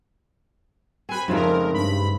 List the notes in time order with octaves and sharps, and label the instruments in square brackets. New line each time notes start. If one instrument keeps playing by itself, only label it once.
[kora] C4 B4 [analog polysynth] G#5 B5
[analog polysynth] F2 A#4 [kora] G#2 C#3 A3
[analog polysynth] G2 B5